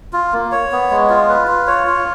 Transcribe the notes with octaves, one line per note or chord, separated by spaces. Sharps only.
F4
A#3
C#5
B3
G#3
F4
B4
F4
C#5
F4